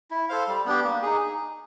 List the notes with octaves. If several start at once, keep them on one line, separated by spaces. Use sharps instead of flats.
E4
A4 C5 F5
G3
B3 D4 G4
A#3
D#4 G#4